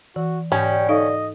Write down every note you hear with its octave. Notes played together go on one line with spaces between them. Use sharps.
E3 F#4
G#2 B2 D3 G3 C#4 G5
D#4 A4 D#5 F5